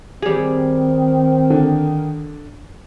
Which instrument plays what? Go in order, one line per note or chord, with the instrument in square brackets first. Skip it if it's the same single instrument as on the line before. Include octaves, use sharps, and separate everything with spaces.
[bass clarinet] D#3 [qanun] G3 G#4 [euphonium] C4
[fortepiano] D3